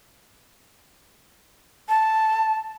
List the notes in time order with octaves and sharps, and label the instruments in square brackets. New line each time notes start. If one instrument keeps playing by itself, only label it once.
[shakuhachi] A5